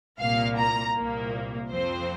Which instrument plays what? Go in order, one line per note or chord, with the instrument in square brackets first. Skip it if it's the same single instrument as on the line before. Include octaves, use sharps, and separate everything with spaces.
[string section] C2 A#2 A#3 F5
A#5
C2 A#2 A#3
F2 F3 C4 C5